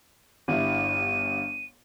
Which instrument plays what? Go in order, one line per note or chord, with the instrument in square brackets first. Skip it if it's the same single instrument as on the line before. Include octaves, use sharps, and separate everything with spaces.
[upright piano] G1 G2 E4 [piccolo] D#7